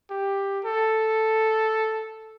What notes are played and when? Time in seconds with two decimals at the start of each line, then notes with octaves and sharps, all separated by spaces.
0.10 G4
0.65 A4